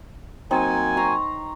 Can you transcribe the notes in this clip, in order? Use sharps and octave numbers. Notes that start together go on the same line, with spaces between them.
F#3 A#3 C4 D#4 G#5
A#5 C6 C#6